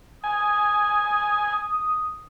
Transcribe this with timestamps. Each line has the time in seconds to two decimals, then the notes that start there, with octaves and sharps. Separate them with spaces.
0.24 G#5 D#6